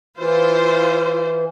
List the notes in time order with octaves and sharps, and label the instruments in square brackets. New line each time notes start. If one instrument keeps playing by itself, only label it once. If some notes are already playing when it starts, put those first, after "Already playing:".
[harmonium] E3 [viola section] E4 F4 C5